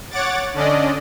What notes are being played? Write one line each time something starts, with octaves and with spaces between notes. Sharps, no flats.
C#5 F#5 D6 A6
D3 C#4 D4 D5 D#5